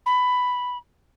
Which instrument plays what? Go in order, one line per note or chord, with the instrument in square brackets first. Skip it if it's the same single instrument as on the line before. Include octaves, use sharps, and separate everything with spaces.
[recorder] B5